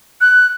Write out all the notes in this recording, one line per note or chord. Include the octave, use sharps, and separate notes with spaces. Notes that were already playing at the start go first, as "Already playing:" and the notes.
F#6